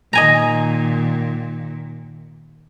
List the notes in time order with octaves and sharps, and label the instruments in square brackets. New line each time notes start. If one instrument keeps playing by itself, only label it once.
[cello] A#2 D#3 [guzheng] D#5 G#5 A#5